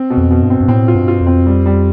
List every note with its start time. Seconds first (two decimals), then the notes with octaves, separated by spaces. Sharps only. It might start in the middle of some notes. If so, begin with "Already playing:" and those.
Already playing: C4
0.10 B2
0.17 F2
0.30 B2
0.43 G2
0.50 C4
0.61 G2
0.68 A2 C4
0.88 F4
0.95 G2
1.08 F4
1.21 F2
1.27 C4
1.46 G3
1.66 G3